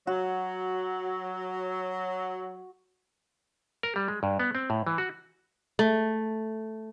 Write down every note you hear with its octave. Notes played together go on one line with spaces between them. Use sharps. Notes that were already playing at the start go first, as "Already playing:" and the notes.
F#3 F#4
A#4
G3
G#3
G2
B3
C4
A2
E3
F#4
A3